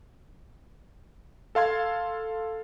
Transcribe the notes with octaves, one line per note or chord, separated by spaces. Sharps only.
A4 F5 C6 G#6